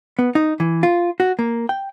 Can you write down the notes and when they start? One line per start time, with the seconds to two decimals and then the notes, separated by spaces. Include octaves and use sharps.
0.19 B3
0.35 D#4
0.60 E3
0.83 F4
1.20 F#4
1.39 A#3
1.69 G5